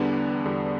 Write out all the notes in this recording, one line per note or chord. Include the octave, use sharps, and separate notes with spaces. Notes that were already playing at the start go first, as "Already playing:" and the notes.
Already playing: E2 D3 G3 B3 D4
E2 D3 G3